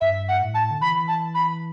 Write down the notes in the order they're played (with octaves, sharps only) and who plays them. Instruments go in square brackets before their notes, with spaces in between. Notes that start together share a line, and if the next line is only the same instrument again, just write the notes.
[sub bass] G2 [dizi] E5
[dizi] F#5
[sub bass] A2
[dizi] A5
[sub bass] D3
[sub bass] E3 [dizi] B5
[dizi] A5
B5